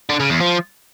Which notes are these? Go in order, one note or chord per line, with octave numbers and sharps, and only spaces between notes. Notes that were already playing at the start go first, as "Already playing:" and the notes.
D3
C#3
E2
F3